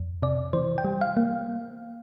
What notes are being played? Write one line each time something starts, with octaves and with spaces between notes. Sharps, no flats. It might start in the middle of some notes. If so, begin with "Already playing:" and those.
Already playing: F2
C3 D5
E3 C5
G5
G3
F5
A#3